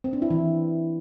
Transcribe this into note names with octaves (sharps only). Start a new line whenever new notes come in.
C4
D4
E4
E3